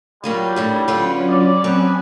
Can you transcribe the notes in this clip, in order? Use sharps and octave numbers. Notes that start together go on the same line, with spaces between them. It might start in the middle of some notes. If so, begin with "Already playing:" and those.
F#3 G3 A#3 F4
D#2 A2 D3
D3 F#3 C#4 F4 B4
D5
B3 C4 D4 B4 G#5